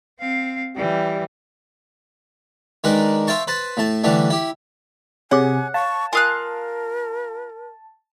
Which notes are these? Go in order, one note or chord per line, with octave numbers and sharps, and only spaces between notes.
C4 F5
E3 G3
D#3 G#3 D4 A#4 B4
C5 E5 F5 G5 A5 C#6
B4 C5 A5
A2 A3 A5
D3 E3 G3 A3 D4
E4 G4
C3 G#4 C#5 F#5 G#5 D6
F5 A5 C#6
F4 A#4 F5 G#5 D#6 F#6